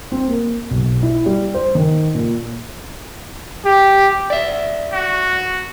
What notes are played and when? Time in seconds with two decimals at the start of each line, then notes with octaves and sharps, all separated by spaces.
0.12 C4
0.28 A#3
0.71 B1
1.03 E4
1.26 G3
1.54 C5
1.75 D#3
2.15 A#2
3.65 G4
4.30 D5 E5
4.92 F#4